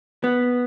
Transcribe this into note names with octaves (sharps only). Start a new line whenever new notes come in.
B3